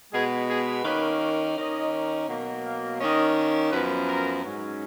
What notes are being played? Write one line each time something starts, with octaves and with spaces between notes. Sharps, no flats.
B2 G#3 B3 G#4
G#4
D#3 A#3 C#4 B4
D#3 A#3 C#4 D#5
B2 F#3 A#3
F5
D#3 A#3 C#4 D#5
F#2 F3 B3 B4
A#4
G#2 F#3 C#4